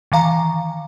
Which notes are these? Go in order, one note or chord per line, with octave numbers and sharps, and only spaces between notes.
D#3 E3 F5 A#5